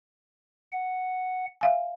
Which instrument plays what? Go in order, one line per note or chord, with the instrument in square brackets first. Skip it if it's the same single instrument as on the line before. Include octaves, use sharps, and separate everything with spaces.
[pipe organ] F#5
[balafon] E5 F5 G#5